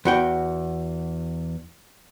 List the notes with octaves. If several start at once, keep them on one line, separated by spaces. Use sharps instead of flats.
E2 F#4 G5